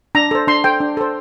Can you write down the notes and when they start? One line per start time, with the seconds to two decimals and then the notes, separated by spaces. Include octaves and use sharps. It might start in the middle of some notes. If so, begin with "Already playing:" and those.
0.15 D4 A#5
0.31 A4 C5
0.47 D4 C6
0.64 A4 C5 G5
0.80 D4
0.97 A4 C5